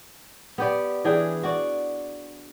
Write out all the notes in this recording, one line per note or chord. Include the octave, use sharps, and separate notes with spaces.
B3 G4 D5
E3 D4 G#4 G5
F#4 D5